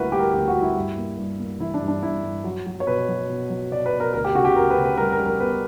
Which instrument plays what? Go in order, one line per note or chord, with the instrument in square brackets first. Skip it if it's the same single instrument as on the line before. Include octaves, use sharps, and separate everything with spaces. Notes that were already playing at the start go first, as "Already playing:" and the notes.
Already playing: [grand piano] D2 G3 A#3 E4 F#4 A#4 B4
G3 G4
A#4
D2 G4
F#4
G3
E4
G2
A#3
G2
A#3
E3 E4
D4
G2
D4
G2 E4
G2
F#3
F#3
C#5
B2 B4
F#3
B2
F#3
B2 D5
B4
B2
A#4
D2 A#4
G4
C#3 F#4
G4
D2 A#4
B4
C#3
B4
G3 A#4
A#4
G3
A#4
B3 B4